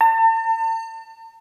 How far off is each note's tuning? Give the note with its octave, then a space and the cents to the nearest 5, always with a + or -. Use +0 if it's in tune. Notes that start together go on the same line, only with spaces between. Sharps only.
A5 +45